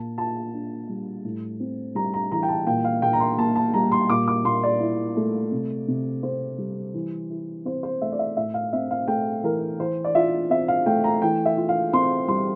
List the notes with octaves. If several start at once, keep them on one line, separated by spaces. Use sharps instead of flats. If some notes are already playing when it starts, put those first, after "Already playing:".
Already playing: A#2 A5
F4 A5
D4
G3
A2
C4
G3 A#5
A#5
E3 A#5
G5
A5
A#2 G5
F5
A#2 G5
A#5
C6
A#3 A5
A5
G3 A#5
C6
A#2 D6
D6
A#2 C6
D5
E4
A3
C3
C3
C4 C5
G3
E3
E4
C4 C5
C5
A3 E5
D5
E5
A2 E5
F5
C4 E5
F5
A3 G5
E3 A#4
E3 C5
D5
F4 E5
C4 E5
F5
A3 G5
A#5
E3 G5
E5
F4
F5
C4 C6
G3 C6